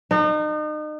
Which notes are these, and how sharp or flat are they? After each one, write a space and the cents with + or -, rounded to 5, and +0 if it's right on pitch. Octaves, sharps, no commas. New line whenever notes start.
D#4 -35